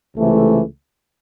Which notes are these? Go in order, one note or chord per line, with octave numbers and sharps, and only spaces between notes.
C#2 C3 E3 A3